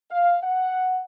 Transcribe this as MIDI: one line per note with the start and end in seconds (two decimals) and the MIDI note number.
0.11 0.38 77
0.43 1.02 78